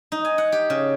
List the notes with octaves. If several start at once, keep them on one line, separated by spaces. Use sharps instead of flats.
D#4
G#5
F#5
G4
C#3